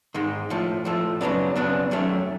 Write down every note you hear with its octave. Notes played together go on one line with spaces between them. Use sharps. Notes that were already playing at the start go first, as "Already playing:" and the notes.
G#2 D#3 G#3
A2 F3 A3
A2 F3 A3
F#2 C#3 F#3 B3 D4
F#2 C#3 F#3 B3 D4
F#2 D#3 F#3 A3 C#4